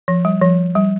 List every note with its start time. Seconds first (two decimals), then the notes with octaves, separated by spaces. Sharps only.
0.08 F3
0.25 G3
0.42 F3
0.75 G3